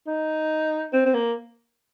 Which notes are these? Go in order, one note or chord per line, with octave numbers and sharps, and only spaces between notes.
D#4
C4
C4
A#3